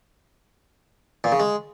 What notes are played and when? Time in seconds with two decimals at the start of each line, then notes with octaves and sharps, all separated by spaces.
1.24 A#2
1.32 C#3
1.40 G#3